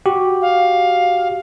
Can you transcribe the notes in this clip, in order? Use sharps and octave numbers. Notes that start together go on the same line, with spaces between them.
F#4 G4
F5